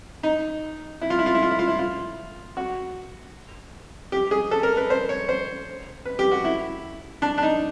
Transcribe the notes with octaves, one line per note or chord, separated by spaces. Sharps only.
D#4
E4
F4
E4
F4
E4
F4
E4
F4
E4
F4
F#4
G4
G#4
A4
A#4
B4
C5
C#5
C5
B4
G4
F#4
E4
D4
D4
D#4